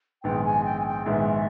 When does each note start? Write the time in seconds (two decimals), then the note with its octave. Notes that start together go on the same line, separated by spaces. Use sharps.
0.23 A#1 G#2 D#3 G#3 B3 G5
0.44 G#5
0.65 G5
0.80 G#5
0.86 G5
1.06 A#1 G#2 D#3 G#3 B3 E5